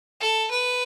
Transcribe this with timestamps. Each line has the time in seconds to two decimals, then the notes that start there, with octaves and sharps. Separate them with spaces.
0.21 A4
0.51 B4